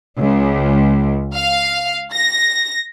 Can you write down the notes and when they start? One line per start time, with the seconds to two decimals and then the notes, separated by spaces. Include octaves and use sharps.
0.19 C#2
1.34 F5
2.13 A#6